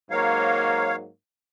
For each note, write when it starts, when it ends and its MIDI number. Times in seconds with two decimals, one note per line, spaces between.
0.11 1.09 44
0.11 1.09 54
0.11 1.09 58
0.11 0.96 73
0.11 0.96 77